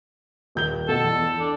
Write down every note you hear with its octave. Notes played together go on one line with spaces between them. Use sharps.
D#1 G6 G7
B2 A4
E2
D4